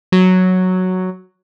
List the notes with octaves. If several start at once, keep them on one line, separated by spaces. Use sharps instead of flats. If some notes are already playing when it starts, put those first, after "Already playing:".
F#3